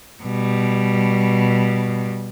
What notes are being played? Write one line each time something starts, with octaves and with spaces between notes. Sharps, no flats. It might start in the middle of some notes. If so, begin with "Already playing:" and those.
B2 G3